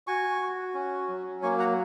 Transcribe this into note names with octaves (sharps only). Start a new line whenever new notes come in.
F#4 G#5 C#6
F#4
C#4
F#3
A#3 G#5 C#6
F#5 A#5